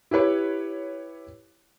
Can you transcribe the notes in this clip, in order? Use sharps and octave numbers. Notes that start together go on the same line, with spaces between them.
E4 G4 B4 C#5